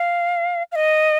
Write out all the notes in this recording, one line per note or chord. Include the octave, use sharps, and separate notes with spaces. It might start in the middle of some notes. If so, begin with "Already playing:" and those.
Already playing: F5
F5
D#5